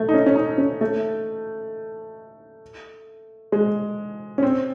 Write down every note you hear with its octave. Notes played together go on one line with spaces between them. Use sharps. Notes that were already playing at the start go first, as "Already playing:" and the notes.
Already playing: A3
D#4
C#4
C#4
D#4
C#4
A3
G#3
C#4
C4